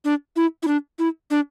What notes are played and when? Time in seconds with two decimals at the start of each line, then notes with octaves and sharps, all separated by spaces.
0.05 D4
0.36 E4
0.63 E4
0.68 D4
0.99 E4
1.31 D4